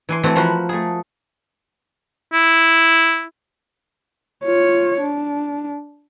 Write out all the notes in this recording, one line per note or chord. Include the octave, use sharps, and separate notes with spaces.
E3 G#5 C6
E3 A3 C4 F#4
F3 F#4 A#4 B4 F5
A3 G#4
E4
F4 C#5
D4